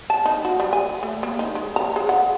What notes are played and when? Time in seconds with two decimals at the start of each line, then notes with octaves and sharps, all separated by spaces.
0.10 A5
0.26 D#4
0.45 F#4
0.60 G3
0.73 G#5
1.03 A3
1.23 A#3
1.39 D#4
1.55 G#3
1.76 A#5
1.96 G#4
2.09 F#5